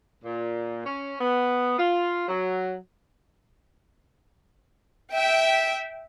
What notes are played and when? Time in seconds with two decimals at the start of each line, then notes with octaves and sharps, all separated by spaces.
0.24 A#2
0.85 C#4
1.21 B3
1.79 F4
2.28 F#3
5.13 E5 G5